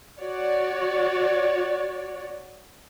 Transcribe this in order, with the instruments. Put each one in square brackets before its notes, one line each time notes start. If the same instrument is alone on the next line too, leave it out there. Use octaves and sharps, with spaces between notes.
[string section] F#4 C#5 D5